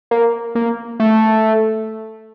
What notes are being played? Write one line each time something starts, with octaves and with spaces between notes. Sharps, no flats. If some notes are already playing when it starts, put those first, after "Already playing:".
A#3
A#3
A3